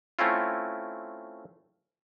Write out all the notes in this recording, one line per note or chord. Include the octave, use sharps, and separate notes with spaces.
A3 C4 C#4 E4 F4